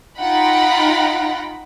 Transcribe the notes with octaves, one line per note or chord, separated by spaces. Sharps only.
D#4 F4 F#5 G5 A#5 B5